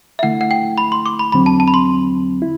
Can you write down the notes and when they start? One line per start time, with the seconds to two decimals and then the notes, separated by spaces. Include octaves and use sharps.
0.19 E5
0.23 D3 A3 E4 F#5
0.41 F#5
0.51 G5
0.78 B5
0.92 C6
1.06 D6
1.19 B5
1.32 E2 D3 F#3 C4 B5
1.46 A5
1.60 A5
1.68 B5
1.74 C6
2.42 E4